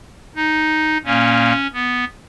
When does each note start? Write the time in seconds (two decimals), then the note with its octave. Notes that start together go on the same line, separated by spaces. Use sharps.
0.36 D#4
1.04 A#2 A#3 C#4
1.73 B3